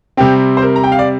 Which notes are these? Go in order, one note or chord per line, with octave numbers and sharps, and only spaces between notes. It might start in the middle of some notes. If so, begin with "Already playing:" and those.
C3 G3 C4 G4
C5
A#4
A#5
G5
F5
D5